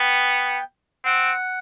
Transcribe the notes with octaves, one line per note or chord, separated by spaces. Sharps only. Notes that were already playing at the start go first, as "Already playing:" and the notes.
Already playing: B3 G5
C4 F#5